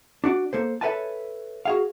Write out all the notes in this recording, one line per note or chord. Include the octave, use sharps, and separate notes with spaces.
D4 F#4 D5
A#3 A4 C5
A4 B4 C#5 E5 G#5 A5
F#4 G#4 F5